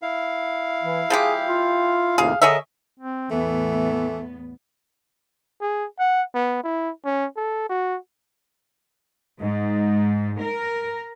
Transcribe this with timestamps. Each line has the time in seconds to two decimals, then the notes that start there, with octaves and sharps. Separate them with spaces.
0.02 E4 F5
0.84 E3
1.10 F3 G#3 G4 G#4
1.47 F4
2.18 D#2 A2 C3 G#4 F5
2.42 D3 G#4 A#4 C#5 D#5 E5
2.99 C4
3.31 E2 A2 E3 A3 B3
5.61 G#4
5.99 F#5
6.34 B3
6.63 E4
7.05 C#4
7.36 A4
7.69 F#4
9.39 G#2
10.40 A#4